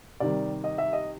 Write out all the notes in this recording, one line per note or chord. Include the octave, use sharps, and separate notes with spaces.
C3 D#3 G3 D5
D#5
E5
D#5